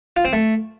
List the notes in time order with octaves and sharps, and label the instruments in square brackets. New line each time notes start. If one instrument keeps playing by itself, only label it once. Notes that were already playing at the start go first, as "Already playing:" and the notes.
[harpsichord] F4
C4
A3